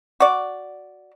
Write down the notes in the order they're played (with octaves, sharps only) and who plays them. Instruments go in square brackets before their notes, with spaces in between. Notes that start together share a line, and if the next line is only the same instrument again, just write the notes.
[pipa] F#4 D5